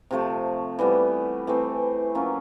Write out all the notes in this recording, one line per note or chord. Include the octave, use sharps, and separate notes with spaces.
C3 F3 A3
E3 G3 B3
E3 A3 C4
F#3 A#3 C#4 F4